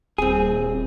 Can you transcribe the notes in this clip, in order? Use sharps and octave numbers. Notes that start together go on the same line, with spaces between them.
D#1 C4 G#4